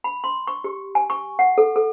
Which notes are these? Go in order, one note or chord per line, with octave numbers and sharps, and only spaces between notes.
B5
C6
C#6
G4
G#5
C#6
F#5
A4
A4